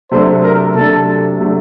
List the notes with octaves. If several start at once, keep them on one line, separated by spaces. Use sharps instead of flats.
C3 F#3 A3 D4 C5
A#4
C3 F#3 A3 D4 A4
C3 F#3 A3 D4